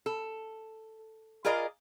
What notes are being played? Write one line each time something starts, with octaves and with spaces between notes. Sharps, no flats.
A4
F4 G#4 A#4 D5 D#5